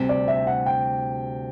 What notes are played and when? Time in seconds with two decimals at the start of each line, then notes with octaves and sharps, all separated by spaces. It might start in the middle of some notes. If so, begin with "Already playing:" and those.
Already playing: D2 C3 G3
0.09 D5
0.28 E5
0.47 F#5
0.66 G5